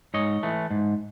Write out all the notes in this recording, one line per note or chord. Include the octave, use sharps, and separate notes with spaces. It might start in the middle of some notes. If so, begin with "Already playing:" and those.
G#2 C#5 D#5
E3 A3
G#2